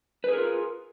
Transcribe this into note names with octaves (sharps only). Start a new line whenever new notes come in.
F4 G#4 A#4 B4